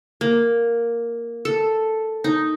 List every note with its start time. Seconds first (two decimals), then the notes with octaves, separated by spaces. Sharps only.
0.21 A#3
1.45 A4
2.24 D#4